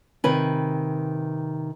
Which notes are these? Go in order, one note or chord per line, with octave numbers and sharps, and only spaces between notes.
C3 D#3 B4 G#5